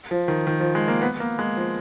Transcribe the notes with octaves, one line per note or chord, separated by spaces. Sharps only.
F3
D#3
D#3
F3
G#3
A#3
B3
A#3
G#3
F3